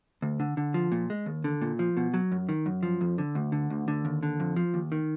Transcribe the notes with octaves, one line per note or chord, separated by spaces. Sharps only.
D2
D3
D3
F3
A#2
G#3
D#2
D3
A#2
F3
B2
F#3
F#2
D#3
F#2
F3
F2
D3
D2
D3
D2
D3
D#2
D3
F2
F3
D#2
D#3